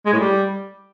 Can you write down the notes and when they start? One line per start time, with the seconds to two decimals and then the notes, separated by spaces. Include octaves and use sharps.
0.06 G#3
0.13 A2
0.20 G3